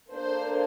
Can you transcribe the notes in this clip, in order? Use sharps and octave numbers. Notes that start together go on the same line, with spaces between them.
A#3 D4 A4 C5